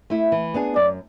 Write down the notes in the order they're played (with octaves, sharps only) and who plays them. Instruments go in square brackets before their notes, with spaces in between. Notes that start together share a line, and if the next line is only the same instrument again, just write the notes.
[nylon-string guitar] A3 E4
E3
B3 D4 G#4
[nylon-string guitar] F#2 [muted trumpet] D5